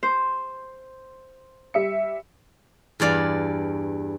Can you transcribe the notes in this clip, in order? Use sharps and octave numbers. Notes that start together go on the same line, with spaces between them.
C5
G3 E5 C#7
E2 G2 D5 F5